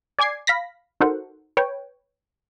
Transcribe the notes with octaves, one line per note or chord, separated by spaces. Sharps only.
D5 G#5 D6 G#6 C7
F5 B5 A#6 B6
D#4 F#4 A4 A#4 C5 F#5
B4 C#5 G5